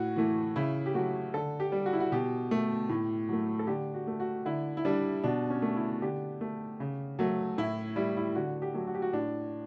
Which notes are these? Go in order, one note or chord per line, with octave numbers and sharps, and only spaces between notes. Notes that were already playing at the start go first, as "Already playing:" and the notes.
Already playing: A2 F#4
E3 A3
C#3 E4
G4
F#3 A3 F#4
D3 A4
G4
G3
F#4
E4
F#4
B2 G4
A3
A2
F#3 A3
A4
D3 G4
F#4
A3
F#4
D3 E4
E4
G3 D4
B2 D4
C#4
A3
E4
D3 G4
A3
C#3
F#3 A3
A2 E4
G3 E4
E4
D3 F#4
G4
F#3 A3
F#4
G4
F#4
A2 D4